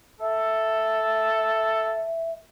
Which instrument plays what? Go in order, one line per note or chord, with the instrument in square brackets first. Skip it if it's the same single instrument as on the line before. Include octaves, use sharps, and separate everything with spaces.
[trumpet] A4 [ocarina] E5